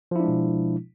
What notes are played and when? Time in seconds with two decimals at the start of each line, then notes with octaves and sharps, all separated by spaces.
0.11 F3
0.16 E4
0.20 D4
0.24 G#3
0.28 B2